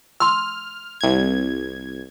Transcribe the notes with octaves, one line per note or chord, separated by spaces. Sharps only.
C6 E6 F6
C2 G#6